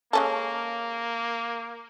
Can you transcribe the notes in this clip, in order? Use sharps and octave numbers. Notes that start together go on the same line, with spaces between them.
G#3 A#3 C#4 A4